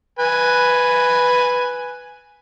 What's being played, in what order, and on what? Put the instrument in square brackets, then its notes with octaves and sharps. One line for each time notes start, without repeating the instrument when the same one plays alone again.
[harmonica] B4 G#5